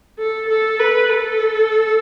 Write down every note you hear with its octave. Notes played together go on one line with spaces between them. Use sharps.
A4
A4
B4
A4